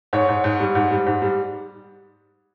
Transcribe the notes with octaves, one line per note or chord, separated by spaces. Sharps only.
G#2 C#5
G#2
G#2
G3
G#2
G3
G#2
G3